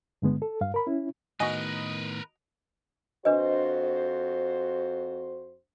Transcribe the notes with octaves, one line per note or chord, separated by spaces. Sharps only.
G2 D3 G#3 B3
A4
G2 F5
A#4 B5
C#4 E4
A2 D#3 B3 F#4 A#4 B4 D#5 G#5
F2 D4 F#4 B4 C5 D#5